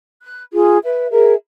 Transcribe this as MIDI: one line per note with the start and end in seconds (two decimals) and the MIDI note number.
0.21 0.42 90
0.53 0.78 65
0.53 0.78 68
0.85 1.09 71
0.85 1.09 76
1.10 1.33 68
1.10 1.33 70
1.10 1.33 76